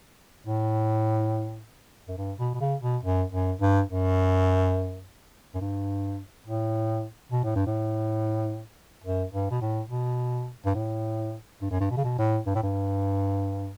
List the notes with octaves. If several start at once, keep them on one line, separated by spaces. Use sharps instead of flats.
A2
F#2
G2
B2
B2
C#3
B2
F#2
F#2
G2
F#2
F#2
G2
A2
B2
A2
G2
A2
F#2
G2
B2
A2
B2
G2
A2
G2
F#2
G2
B2
C#3
B2
A2
G2
A2
G2